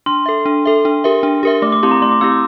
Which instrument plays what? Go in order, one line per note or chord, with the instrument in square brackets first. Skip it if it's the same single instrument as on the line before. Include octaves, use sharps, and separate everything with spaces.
[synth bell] D4 [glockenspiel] C6
[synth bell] A4 E5
D4
A4 E5
D4
G4 A#4 E5
D4
G4 A#4 E5
[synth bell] A3 [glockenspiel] D6
[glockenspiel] D6
[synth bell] C4 E4 G4 [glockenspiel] C6
[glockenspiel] A#5
[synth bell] A3 [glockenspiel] C6
[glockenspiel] D6
[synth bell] C4 E4 G4 [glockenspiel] E6
[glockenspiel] D6